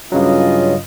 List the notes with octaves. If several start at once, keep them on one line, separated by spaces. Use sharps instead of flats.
G2 C#3 F#3 C#4 F4 D#5